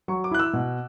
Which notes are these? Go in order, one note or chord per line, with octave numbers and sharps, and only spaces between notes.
F#3 C#6
D6
E4 F#6
E6
B2